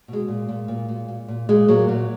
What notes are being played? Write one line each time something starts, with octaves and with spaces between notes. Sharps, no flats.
B2 G#3
A#2
A#2
A#2
A#2
A#2
A#2
A#2 G#3
A#2 F#3 A#3
A#2 F#3